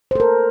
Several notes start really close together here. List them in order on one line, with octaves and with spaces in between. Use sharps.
C5 A4 A#4